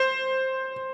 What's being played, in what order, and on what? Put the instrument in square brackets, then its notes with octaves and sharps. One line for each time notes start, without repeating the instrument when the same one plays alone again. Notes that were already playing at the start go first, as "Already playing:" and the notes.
Already playing: [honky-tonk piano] C5